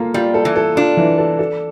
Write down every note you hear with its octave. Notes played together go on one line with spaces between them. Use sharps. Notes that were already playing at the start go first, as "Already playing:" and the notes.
Already playing: A#3 F4 A4
G3 F4
A4
E3
A4
D4 F4
E3
A4
A4